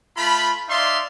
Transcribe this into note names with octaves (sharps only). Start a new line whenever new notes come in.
A3 F4 B5
D#4 D5 E5 F5 C6